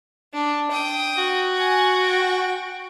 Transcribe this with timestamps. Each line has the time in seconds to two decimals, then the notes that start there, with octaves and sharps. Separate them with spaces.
0.34 D4
0.71 G5 D#6
1.18 F#4
1.53 F#5 G#5
2.02 G5